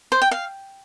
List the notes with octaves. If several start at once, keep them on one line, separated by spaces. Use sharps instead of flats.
C5
G5
F5